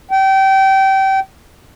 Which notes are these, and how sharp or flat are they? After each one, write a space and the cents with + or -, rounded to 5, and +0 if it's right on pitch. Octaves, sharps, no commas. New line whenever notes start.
G5 -25